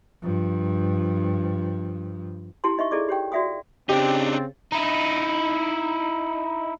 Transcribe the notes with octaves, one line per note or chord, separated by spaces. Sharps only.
G2 F3
E4 G4 G#5 A5 C6
D#4 D#5 E5 C#6
E4 G#4 A4 D5 D#5 D6
G4 C#5 G5
F#4 D5 E5 F5 G#5 D#6
C#3 C4 D4 D#4 G4
D#4 E4